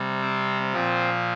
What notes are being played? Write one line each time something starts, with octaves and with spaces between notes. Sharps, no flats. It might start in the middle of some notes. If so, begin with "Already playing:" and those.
Already playing: C3 G3
C4
A#2 F3 C4